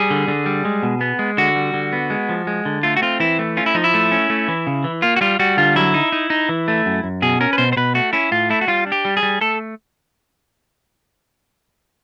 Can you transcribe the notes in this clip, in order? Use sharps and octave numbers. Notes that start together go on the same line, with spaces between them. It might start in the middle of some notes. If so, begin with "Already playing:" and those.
Already playing: G3 G#4
D3
D3
G3
G#3
B2
B3
G#3
D3 F#4
G3
D3
B3
G#3
F3
G#3
D3
A3 F4
F#4
C4 F4
E3 E4
A3
C#4 F4
E4
F3 D#4
E4
A3
C#4
A3
E3
C#3
E3
A#3 F4
F#4
G3 F4
G3 F#4
D3 F4
F#3 E4
D#4
D#4
D#4
E3
A3
F#2
F#2
B2 G#4
C#4 A#4
B4
B2 C5
C5
B2 B4
A3 F#4
C#4 E4
A2 F4
A3 E4
F#4
G3 F4
D4
G4
G3
G#4
G3
A3 A4